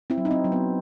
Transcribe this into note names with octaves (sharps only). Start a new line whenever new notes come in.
C4 E4
F#3
D#4
C4
F#3
B3